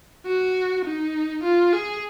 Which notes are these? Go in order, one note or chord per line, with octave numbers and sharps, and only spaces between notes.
F#4
D#4
F4
G#4